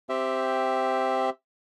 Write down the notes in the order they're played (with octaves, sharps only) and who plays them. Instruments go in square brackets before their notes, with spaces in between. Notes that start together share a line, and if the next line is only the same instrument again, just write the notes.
[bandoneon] C4 G4 E5